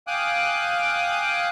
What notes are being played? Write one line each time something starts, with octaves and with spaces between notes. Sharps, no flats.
F5 G5 G#5 D6 D#6 F#6